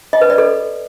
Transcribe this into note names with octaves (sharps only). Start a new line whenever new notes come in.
D#5
B4
D5
A4